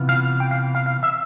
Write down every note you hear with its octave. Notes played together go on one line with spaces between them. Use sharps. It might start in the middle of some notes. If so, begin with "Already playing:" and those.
Already playing: C3 E3 B3 F4
F5
G5
F5
F5
F5
E5